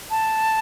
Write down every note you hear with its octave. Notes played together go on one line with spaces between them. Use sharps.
A5